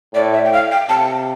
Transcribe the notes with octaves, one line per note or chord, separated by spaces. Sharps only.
A2 D5
E5
G5
F5
G5
C3 A5